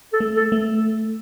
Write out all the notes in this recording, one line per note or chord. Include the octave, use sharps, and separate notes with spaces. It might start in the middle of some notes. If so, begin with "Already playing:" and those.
A4
A3
A4
A3